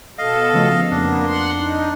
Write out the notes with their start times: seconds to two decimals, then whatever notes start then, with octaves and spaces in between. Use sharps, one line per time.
0.18 B2 A4 D#5 F5
0.53 C#3 F3 A3
0.91 F2 A#3 B3 D4
1.26 F#5 C6
1.57 D#4